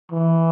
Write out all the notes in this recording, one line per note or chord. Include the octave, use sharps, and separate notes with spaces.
E3